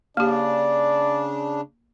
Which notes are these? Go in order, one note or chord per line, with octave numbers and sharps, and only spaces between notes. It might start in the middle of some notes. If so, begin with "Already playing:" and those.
C#3 A#3 D4 G4 D5